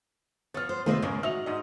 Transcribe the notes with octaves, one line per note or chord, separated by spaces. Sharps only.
F3 B3 C#5 F6 A6
C5
C3 D#3 G#3 A3 B3 F4 B4 C5
C#2 A2 G#3 A#3 C#4
D#4 F#4 E5 F7 G7
G#2 D#5